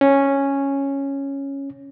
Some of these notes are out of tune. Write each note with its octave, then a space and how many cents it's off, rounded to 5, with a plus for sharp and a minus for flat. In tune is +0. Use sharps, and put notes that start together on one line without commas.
C#4 -5